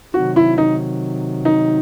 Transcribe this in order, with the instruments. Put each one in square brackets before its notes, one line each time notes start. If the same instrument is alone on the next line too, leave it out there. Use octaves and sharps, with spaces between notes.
[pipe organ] C3 D#3 F#3 [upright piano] F#4
[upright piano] E4
D#4
D#4